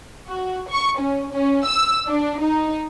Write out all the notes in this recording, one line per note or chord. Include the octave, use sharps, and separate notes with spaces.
F#4
C#6
C#4
C#4
E6
D4
D#4